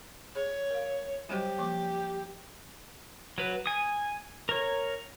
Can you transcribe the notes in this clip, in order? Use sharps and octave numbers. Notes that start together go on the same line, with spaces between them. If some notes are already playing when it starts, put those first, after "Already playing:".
G#4 C#5
A#4 F5
F#3 G3 G4 C5
F3 A#3 D6
F#3 B4
G#5 D#6
A#4 C#5